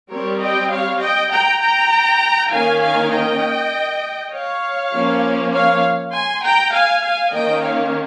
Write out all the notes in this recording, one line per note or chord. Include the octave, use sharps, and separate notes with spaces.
G3 C4 A#4 C#5
D#5 G5
C#5 F5
D#5 G5
G5 A#5
G5 A#5
D#3 A#3 C#4 F5 G#5
F5 G#5
D#5 G5
C#5 F5
F3 A#3 C#4
C#5 F5
G#5 C6
G5 A#5
F5 G#5
F5 G#5
D#3 A#3 C#4 D#5 G5
C#5 F5